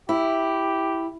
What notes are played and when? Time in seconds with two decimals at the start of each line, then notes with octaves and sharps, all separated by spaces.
0.09 E4 G4